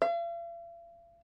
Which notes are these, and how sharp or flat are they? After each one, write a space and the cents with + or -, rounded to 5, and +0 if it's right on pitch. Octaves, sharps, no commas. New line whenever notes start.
F5 -45